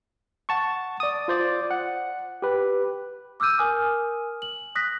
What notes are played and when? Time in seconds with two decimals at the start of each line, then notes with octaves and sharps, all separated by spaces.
0.49 F#5 A5 C#6
1.00 D5 D#6
1.28 F4 C5 D5
1.71 F#5
2.42 G4 B4
3.40 D6 E6 F6 G6 D#7
3.58 A#4 G#5 D#6 F6
4.42 F#7
4.75 D#6 F#6 A#6 B6